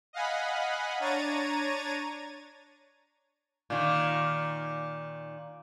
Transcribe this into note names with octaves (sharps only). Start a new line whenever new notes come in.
D#5 F5 F#5 G#5 B5
D4 C#5 A#5 G#6 A6 D#7
A#2 D#3